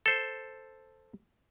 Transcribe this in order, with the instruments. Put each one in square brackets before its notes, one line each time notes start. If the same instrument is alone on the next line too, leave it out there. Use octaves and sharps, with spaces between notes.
[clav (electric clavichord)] A4 C5